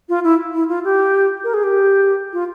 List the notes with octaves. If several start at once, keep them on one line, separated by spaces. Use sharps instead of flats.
F4
E4
E4
F4
G4
A#4
G#4
G4
F4